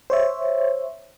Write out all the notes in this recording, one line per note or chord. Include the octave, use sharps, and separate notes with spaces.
C5 C#5 E5